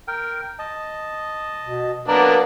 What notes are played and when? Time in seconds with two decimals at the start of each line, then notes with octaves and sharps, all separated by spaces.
0.08 A#4 G5
0.59 D#5 A5
1.63 B2
2.08 F#3 A#3 B3 D4 A#4 D5